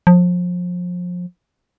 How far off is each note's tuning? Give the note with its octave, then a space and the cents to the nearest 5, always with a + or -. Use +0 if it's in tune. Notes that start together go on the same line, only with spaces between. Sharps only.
F3 +30